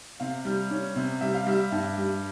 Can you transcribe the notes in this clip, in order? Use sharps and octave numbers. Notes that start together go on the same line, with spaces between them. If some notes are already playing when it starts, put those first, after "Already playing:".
C3 F5
G3
C#4
C3
G3 E5
F5
G3 E5
G2
G3